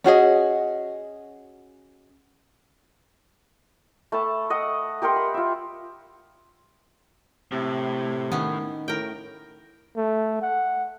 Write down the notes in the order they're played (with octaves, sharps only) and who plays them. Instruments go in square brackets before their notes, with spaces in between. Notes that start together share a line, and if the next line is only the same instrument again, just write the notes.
[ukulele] C#4 F#4 G#4 D#5
[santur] A3 B4 A5
D#5 F#5 D#6
G4 A#4 F#5 C6
B5
F4 E5
[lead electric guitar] A2 [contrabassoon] C3
[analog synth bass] D#3 [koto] B3 C#4
[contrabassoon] A2 [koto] A#4 G5
[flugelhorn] A3
F#5